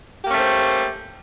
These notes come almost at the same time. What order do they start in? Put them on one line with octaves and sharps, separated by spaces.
G4 A#3 C#4 A3 C5